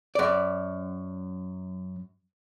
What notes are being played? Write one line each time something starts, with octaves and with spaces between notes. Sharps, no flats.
F#2 D5